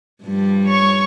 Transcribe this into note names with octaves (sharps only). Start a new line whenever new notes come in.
G2 F3 G3
C#5 C#6